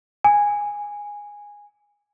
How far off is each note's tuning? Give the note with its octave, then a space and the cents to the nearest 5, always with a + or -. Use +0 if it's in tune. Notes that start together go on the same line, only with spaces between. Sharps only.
G#5 -10